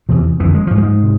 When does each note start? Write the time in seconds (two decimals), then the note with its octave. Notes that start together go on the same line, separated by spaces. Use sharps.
0.09 E2 C3 E3
0.40 F2 D3 E3
0.55 G#3
0.67 G#2 F3
0.78 G#2 G#3
1.03 C3